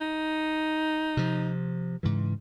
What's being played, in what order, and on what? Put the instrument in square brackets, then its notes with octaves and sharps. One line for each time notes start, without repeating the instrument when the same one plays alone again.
[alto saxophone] D#4
[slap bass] C3 F3
G#2 C#3 E3